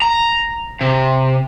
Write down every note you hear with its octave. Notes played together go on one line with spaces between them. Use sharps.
A#5
C3